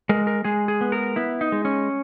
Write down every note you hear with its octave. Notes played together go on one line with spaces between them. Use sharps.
G#3 A#4
A#4
G#3 G#4
G#4
B3
A#4
B3 E4
D#4
G#3
C#4